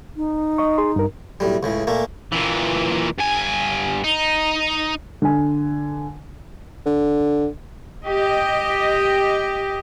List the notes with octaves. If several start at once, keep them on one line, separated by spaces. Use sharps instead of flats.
D#4
D#5 C#6
G#4 C6
G2 A#4
B1 A2 G3
C#2 A2 C#3
A#2 A3 A#3
A#2 E3
G2 G#5
D#4
D3 G#5
D3
G4 D#5